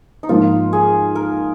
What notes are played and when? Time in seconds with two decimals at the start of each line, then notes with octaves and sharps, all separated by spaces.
0.23 D#4
0.29 G#2 F3 A#3 F4
0.73 G#4
1.15 A#4